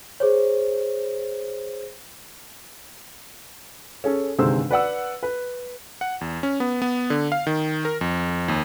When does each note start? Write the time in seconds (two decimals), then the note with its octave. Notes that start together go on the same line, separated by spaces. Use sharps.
0.20 G#4 C5 C#5
4.04 C#4 G#4 A4
4.39 G1 C3 D#3 G#3 C5 E6
4.71 B4 D5 F#5 E6
5.23 B4
6.01 F#5
6.21 E2
6.43 C#4
6.60 B3
6.82 B3
7.10 D3
7.32 F5
7.47 D#3
7.85 A#4
8.01 F2
8.48 D#2